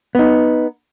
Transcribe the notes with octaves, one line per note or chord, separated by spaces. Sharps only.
B3 D#4